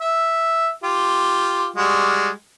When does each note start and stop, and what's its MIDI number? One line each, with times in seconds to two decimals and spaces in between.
0.01 0.68 76
0.84 1.66 65
0.84 1.66 67
1.76 2.29 55
1.76 2.29 56
1.76 2.29 66